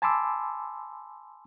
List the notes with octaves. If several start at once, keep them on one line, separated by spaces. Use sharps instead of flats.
G#5 A5 B5 C6 D6 E6